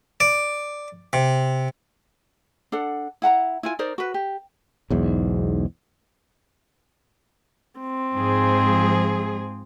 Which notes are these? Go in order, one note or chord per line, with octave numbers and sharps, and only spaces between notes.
D5
C3
D4 A4 F#5
E4 F#5 A5 A#5
E4 F4 G#5
D#4 A#4 C5 D5
F#4 B4
G4
B1 E2 G#2
C4
G#2 F3 G#4